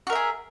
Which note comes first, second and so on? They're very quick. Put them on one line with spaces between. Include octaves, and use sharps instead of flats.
F#4 A#4 E5 G#4